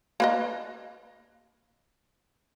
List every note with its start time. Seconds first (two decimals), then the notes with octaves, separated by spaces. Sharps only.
0.20 A#3 B4 D#5